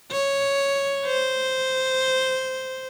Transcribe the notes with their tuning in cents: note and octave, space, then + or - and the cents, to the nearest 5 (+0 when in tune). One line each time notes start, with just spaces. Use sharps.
C#5 +0
C5 -5